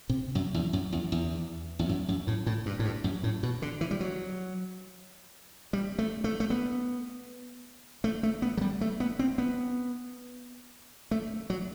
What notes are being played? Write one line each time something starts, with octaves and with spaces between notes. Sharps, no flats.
C3
F#2
E2
F#2
E2
E2
E2
F#2
F#2
A2
A2
G2
A2
G2
F#2
A2
B2
D3
E3
G3
F#3
G3
A3
A3
A3
B3
A3
A3
B3
F#3
G3
A3
B3
C4
B3
A3
F#3